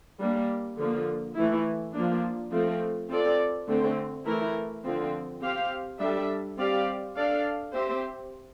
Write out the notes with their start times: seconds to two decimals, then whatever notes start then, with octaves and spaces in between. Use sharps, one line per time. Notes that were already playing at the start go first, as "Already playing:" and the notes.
0.20 G3 A#3 D4
0.78 D3 F3 A#3
1.36 E3 A3 E4
1.94 F3 A#3 D4
2.52 F3 A3 C4
3.10 C4 F4 A4 D5
3.68 D3 A3 C4
4.26 E3 A3 E4 A#4
4.84 D3 F3 C4
5.41 C4 G4 C5 F5
5.99 G3 D4 A4 E5
6.57 G3 C4 G4 D5 F5
7.15 D4 A4 D5 F5
7.73 C4 G4 C5 E5